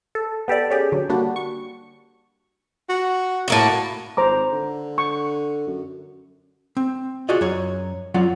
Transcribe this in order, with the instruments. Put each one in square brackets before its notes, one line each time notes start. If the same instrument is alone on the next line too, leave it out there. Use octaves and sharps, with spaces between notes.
[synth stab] A4
B3 G4 A4 D5
C#4 G4 G#4
D3 F#3
G3 A#3 D4 F#4
C#6
[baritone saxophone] F#4
[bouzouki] A2 A#3 F#4
[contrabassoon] G#1 [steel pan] C5 A#5 D6
[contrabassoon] D3
[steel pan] C#6
[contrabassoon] F#2
[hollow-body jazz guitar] C4
F4 F#4 G#4 D5 D#5
F#2 C#5
F#2 F#3 F4 D5 F#5